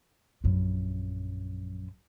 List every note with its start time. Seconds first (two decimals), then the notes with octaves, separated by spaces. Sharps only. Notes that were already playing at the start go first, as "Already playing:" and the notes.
0.44 A#1 F#2